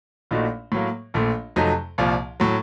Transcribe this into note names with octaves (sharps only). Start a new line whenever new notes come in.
A#1 A#2 A3 D#4 F#4
A2 F#3 A#3
A#1 A#2 A3
F2 C3 F#3 A3 D#4
C2 A#2 F3
A2 F#3